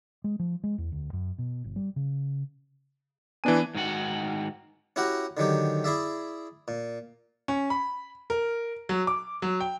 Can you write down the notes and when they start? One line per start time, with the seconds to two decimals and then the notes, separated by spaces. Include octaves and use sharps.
0.24 G#3
0.39 F3
0.64 G#3
0.78 E2
0.92 D2
1.13 F#2
1.38 B2
1.64 G1
1.76 G3
1.96 C#3
3.44 E3 B3 D4 G#5 D#7
3.75 G#2 D#3 F#4 F#5
4.96 C#4 E4 F#4 G4 F#5 A#5
5.37 D3 D#3 F#3 G4
5.84 E4 G#4 D5 E5
6.68 A#2
7.48 C#4
7.70 B5
8.30 A#4
8.89 F#3
9.07 D6
9.42 F#3
9.61 G5